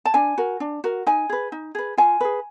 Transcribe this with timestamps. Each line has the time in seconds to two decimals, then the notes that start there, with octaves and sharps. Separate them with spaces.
0.05 A5
0.14 D4 G#5
0.38 F#4 A#4
0.60 D4
0.84 F#4 A#4
1.07 D#4 G#5
1.29 G#4 B4
1.52 D#4
1.75 G#4 B4
1.97 F4 G#5
2.21 G#4 B4